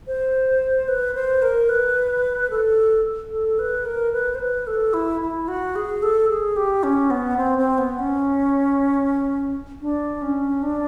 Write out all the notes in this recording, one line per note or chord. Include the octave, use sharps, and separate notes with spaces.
C5
B4
C5
A#4
B4
A4
A4
B4
A#4
B4
C5
B4
A4
E4
E4
F#4
G#4
A4
G#4
G4
C#4
B3
C4
C4
B3
C#4
D4
C#4
D4